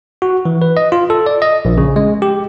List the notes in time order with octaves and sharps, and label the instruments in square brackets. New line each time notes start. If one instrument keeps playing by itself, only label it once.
[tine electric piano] F#4
E3
B4
D#5
F4
A4
D5
D#5
A#1
C#3
G#3
G4